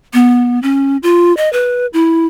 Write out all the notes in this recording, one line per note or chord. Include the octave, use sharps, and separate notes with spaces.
B3
C#4
F4
D#5
B4
E4